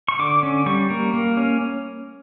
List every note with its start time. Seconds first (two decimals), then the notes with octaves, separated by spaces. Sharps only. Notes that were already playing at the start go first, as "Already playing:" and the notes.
0.09 C#6
0.19 D3 D6
0.43 C#4
0.66 G3 C#6
0.90 A#3
1.14 A#3
1.37 C#4